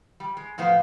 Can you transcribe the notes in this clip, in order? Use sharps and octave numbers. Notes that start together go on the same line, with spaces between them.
G3
G#3
A2 F3 B3 C5 F5